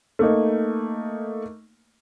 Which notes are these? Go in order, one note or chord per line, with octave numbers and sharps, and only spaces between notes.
A3 A#3 D#4